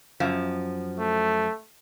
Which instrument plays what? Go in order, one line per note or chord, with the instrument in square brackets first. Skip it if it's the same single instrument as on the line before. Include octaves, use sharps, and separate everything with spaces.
[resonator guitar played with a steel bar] F#2 F3
[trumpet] A3